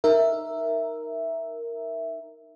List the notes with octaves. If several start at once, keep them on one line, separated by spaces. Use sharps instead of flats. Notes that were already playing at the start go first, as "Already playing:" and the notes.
D#4 A#4 E5